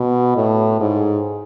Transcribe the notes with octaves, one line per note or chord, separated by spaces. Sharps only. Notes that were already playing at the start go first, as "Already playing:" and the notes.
Already playing: B2
A2
G#2